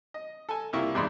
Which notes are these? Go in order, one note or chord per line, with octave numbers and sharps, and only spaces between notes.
D#5
A4 G#5
C2 A#3 E4 F4 C#6
G#1 E2 G#2 D5 B5 C6